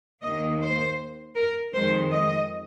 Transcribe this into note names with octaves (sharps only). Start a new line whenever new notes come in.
D#2 D#3 A#3 D#5
C5
A#4
F2 D#3 G#3 C5
D#5